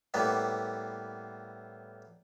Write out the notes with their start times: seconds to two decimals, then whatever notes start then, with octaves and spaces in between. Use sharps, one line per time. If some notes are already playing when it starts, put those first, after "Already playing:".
0.14 A2 G3 A#3 B3